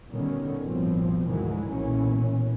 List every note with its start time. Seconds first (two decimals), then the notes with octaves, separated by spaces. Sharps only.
0.10 B2 D3 D#3 G3 C#4
0.60 A1 G2 B2 F3 C4
1.26 D2 G#2 D#3 E3 F#3 G#3
1.74 B1 A#2 E3 C#4